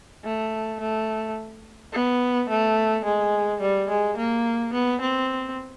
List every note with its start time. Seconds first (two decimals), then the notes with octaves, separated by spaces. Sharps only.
0.25 A3
0.80 A3
1.93 B3
2.49 A3
3.05 G#3
3.61 G3
3.89 G#3
4.17 A#3
4.74 B3
5.01 C4